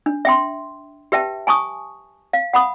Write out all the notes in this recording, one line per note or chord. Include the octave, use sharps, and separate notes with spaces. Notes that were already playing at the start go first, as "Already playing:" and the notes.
D4
E5 G5 C6
G4 B4 E5 G5 A5
G#5 A5 C#6 D#6
F5
F#5 B5 D#6